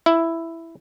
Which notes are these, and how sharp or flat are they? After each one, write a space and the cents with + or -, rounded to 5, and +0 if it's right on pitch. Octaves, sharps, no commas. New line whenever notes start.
E4 +5